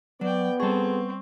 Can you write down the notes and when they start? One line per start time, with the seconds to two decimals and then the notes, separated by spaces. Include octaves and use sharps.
0.21 F#3 B3 D5 G5
0.60 G3 C4 G#4 A4 C#6